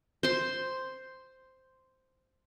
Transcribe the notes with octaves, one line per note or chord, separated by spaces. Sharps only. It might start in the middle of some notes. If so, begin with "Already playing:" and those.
C5 C6